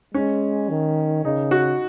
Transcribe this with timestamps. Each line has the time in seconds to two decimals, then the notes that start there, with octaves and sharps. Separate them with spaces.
0.14 G#3 C#4
0.70 D#3
1.24 C#3 D#4
1.51 F#4